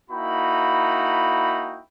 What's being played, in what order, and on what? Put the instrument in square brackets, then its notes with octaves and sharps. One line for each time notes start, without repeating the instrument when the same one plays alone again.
[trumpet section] A#3 D#4 E4 F#4 G5 B5